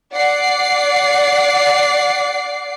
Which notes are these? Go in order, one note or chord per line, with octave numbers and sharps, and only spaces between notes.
D5 F#5 D6 C7